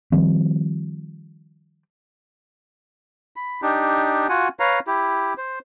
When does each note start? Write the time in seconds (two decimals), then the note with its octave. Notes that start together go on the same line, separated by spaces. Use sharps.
0.12 D#3 F3 G3 C4
3.36 B5
3.62 D4 D#4 G4
4.29 F4 F#4 F#5 G#5
4.60 B4 C#5 F5 A#5
4.87 E4 G4
5.38 C5